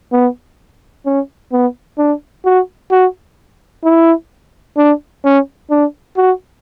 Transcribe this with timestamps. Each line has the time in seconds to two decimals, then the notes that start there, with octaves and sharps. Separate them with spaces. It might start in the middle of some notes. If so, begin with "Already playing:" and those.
0.13 B3
1.06 C#4
1.52 B3
1.98 D4
2.45 F#4
2.91 F#4
3.84 E4
4.77 D4
5.25 C#4
5.70 D4
6.17 F#4